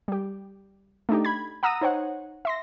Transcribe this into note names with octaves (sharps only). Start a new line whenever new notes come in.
G3 G4
A3 D4 D#4 G4
B5 G#6
F#5 A#5 D#6 E6 A#6 D#7
D#4 C5 C#5 F#5
E5 C6 A#6